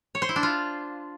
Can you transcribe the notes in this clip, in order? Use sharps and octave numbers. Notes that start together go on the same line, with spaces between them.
C#5
C5
E4
D4
F4